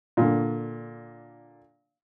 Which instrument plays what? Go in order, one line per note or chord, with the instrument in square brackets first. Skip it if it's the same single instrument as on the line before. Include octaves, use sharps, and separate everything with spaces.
[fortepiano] A#2 D3